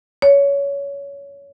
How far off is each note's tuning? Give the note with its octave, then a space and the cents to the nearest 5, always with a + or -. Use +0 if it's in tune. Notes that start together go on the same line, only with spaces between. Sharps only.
C#5 +20